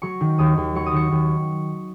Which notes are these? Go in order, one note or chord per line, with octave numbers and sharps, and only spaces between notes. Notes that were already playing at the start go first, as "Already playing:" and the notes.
F#3 C#6
D#3
D#2 D#6
D#2
F#3 C#6
D#6
D#3 C#6
D#2